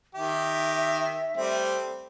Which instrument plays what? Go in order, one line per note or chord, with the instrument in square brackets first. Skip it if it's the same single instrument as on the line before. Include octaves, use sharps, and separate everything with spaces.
[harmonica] D#3 G4 [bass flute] E5
[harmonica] G3 A3 C4